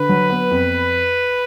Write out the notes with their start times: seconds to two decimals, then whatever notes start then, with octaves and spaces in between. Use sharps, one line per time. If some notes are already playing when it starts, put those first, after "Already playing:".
Already playing: D3 B4
0.09 F#3
0.30 B3
0.51 F2